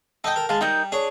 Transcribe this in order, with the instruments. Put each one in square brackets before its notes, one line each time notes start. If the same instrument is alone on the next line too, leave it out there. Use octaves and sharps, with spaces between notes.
[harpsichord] D#4 D#5 [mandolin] A4 G5
[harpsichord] A#4
[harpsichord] G#3 [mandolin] F5 A5
[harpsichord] G3 [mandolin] D#4 A#4 G6
[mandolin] D4 [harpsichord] G#4 C#5